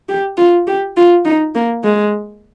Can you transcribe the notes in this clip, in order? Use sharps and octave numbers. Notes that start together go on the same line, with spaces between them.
G4
F4
G4
F4
D#4
A#3
G#3